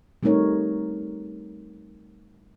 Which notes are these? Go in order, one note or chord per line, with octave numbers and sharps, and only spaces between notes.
G3 A3 C4 D#4 A#4 C#5